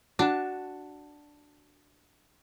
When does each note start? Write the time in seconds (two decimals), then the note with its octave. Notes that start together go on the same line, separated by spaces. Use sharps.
0.19 D4 F#4 A5